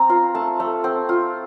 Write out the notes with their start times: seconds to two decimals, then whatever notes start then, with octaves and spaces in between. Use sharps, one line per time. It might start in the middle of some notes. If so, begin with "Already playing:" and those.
Already playing: C4 A#5
0.09 F4 C6
0.35 A3 A5
0.60 A3
0.84 C4
1.09 F4